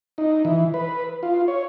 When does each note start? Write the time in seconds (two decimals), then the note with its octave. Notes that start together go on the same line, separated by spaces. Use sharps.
0.18 D#4
0.45 E3
0.74 B4
1.23 F4
1.48 C#5